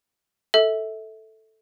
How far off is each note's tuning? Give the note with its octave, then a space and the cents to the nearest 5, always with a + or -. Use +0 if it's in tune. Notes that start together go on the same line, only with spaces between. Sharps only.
A4 +0 E5 -25